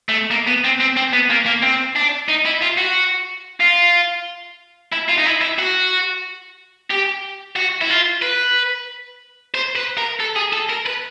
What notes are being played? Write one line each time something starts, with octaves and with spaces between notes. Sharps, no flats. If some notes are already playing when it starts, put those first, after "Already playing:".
A3
A#3
B3
C4
C4
C4
B3
A#3
A#3
C4
D4
D#4
E4
F4
F#4
F4
E4
F4
D#4
E4
E4
F#4
G4
F#4
E4
F4
B4
C5
B4
A#4
A4
G#4
A4
A#4
B4